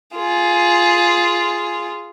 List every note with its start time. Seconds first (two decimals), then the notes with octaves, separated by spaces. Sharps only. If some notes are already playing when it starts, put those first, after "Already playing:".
0.15 F4 G#4